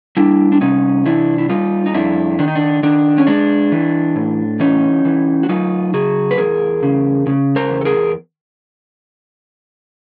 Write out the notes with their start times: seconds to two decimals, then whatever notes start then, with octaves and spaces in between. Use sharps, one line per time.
0.17 G3 D4 E4
0.52 D4
0.61 C3 C#4 D#4
1.06 E3 D4 E4
1.38 E4
1.50 G3 D#4 F4
1.86 D#4
1.94 F2 D4 E4
2.39 D#3 D4
2.48 D#4
2.55 D4
2.83 D#3 D4
3.18 C#4
3.27 G#3 D4
3.72 E3
4.16 A2
4.60 E3 C#4 D#4
5.05 E3
5.43 F#4
5.49 F#3 D#4 F4
5.94 C#3 F#4 G#4
6.31 B4
6.38 E2 G#4 A#4
6.83 C#3
7.27 C#3
7.56 A#4 C5
7.71 E2
7.81 A4
7.85 G#4 A#4